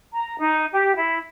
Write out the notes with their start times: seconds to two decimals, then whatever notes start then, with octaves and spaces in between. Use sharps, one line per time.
0.12 A#5
0.39 D#4
0.72 G4
0.95 E4